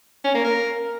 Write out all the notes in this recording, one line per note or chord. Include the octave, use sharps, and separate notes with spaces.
C#4
A#3
A#4